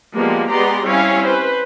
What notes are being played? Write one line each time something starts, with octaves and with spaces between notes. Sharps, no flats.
F3 G3 G#3 A#3 B3
G#3 B3 G4 D5 A#5 C6
G3 C4 C#4 E4 C#5 F5
B4 C5